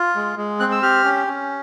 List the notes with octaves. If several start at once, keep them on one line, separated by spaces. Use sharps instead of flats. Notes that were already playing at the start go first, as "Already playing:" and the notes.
Already playing: F4
G#3
G#3
C4 F#6
E6
G4 F6
C#4
C#4